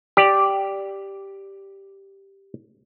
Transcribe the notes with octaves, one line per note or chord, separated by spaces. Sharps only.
G4 D5